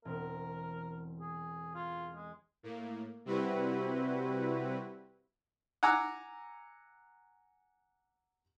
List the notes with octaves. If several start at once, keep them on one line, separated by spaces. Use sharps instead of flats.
E1 B3 C4 A#4
G#4
F4 G#4
G#3
A2 A#3
C3 G3 C4 E4 F#4 B4
F#5 G#5 A#5 D6 E6